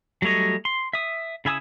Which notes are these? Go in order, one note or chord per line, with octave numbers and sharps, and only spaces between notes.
F#3 G3 A3 C#5 D#5
C6
E5 D#6
C#3 E4 G#5 D#6 E6